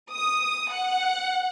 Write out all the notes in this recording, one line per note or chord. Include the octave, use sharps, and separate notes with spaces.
D#6
F#5